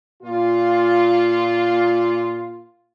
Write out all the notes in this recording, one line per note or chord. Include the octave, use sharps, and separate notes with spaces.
A#2 F4